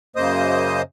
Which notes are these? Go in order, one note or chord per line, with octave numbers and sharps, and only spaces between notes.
F#2 C#3 A#3 C5 D#5 D#6